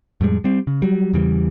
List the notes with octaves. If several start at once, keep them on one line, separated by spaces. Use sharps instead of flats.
F2 A2 G3 G#3
G3 C4
C#3
F#3 G3
E2 C#3 E3 G3